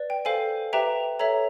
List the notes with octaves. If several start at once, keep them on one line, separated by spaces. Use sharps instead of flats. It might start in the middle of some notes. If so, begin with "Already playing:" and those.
Already playing: B4 D5
G5
A4 C5 F5 G#5
G4 B4 E5 G5 A#5
A4 C#5 E5 A#5